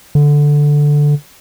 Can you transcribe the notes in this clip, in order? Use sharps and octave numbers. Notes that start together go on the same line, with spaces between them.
D3